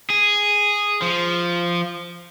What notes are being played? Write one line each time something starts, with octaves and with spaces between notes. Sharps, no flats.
G#4
F3